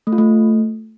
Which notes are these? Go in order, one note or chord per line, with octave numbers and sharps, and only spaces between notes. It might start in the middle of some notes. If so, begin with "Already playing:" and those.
A3
F4
A3